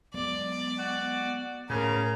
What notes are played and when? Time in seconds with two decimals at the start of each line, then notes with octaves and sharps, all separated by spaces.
0.14 F#3 G#3 B3 D5
0.79 F#4
1.70 A2 C#3 A#4 C#5